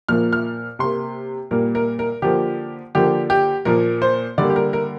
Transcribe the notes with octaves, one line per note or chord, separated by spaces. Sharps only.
A#2 F3 A#3 F6
F6
C3 A#3 C6
A#2 G3 A#3 A#4
A#4
A#4
D3 F3 A#3 G4
D3 F3 A#3 G4
G4
A#2 F3 A#3 A#4
C5
D3 G3 A#3 D5
G4
A#4
A#4